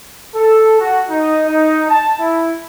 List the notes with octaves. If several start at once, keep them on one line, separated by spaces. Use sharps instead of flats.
A4
F#4
D#4
D#4
A5
E4